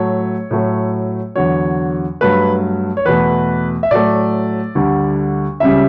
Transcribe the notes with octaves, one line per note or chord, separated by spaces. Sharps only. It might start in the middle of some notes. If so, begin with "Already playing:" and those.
Already playing: A2 F#3 A3 C#5
A2 F#3 A3
E2 D3 F#3 C#5
G2 F#3 A3 B4
C#5
E2 B2 A3 B4
E5
A2 F#3 A3 D5
D2 D3 G3
C#2 C#3 G3 E5